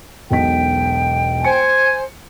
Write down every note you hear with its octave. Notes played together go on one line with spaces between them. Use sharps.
E1 B1 G5 B6
C5 G#5 C#7